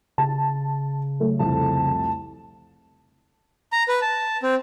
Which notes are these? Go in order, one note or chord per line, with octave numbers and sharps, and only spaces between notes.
C#3 A5
F#3 A3
C2 F2 A5
A#5
B4
A5
C4